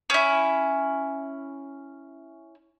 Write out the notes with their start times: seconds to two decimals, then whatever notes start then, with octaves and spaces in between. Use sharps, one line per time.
0.10 C#4 E4